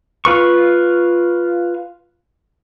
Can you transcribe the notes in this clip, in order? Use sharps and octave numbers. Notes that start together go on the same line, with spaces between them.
F4 B4 C#6